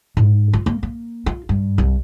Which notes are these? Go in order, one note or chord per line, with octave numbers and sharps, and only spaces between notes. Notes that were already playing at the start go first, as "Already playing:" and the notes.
G#2
F4
A#3
A#3
F4
G2
C2